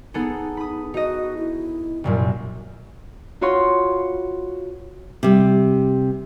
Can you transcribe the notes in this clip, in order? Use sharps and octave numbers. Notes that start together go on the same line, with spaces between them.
B3 D#4 G#4 A4
B5 D#6
D#4 F#4 D#5
E4
C2 F#2 A#2
F4 F#4 B4 C#5 C6
C3 G3